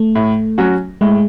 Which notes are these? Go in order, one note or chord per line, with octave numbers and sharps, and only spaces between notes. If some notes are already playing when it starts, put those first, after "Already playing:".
Already playing: A3
A2
F#3 C#4 F#4
A2 G#3